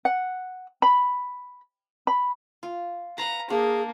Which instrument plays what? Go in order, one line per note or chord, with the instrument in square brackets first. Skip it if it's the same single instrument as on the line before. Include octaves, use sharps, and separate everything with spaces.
[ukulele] F#5
B5
B5
[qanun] F4
[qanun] B4 F5 F#5 [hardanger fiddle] A#5
[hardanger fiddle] A#3 [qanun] D4 [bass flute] G#4